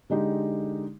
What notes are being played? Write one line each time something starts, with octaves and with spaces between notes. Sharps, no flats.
D3 G#3 D#4 G4